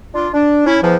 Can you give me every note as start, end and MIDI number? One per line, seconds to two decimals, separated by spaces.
0.15 0.28 62
0.15 0.28 65
0.34 0.65 62
0.66 0.78 61
0.66 0.78 64
0.82 0.96 40
0.82 0.96 53